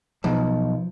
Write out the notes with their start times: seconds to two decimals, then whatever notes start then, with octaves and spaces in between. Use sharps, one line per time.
0.24 B1 F3